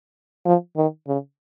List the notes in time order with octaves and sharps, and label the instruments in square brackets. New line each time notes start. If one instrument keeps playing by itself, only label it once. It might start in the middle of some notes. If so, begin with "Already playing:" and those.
[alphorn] F3
D#3
C#3